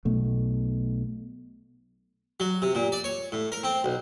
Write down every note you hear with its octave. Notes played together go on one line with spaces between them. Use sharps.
B1 B2 A3
F#3
C3
A#2
D5
C#5
A2
A#4
C4
B1